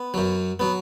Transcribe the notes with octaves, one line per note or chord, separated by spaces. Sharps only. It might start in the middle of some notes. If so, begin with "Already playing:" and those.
Already playing: B3
F#2 F#3
F#3 B3